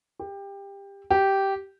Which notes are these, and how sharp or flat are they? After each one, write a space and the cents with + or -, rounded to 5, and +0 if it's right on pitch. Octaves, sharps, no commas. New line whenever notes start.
G4 +20
G4 -10